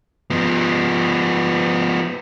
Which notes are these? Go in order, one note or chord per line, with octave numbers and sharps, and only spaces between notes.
F3 B3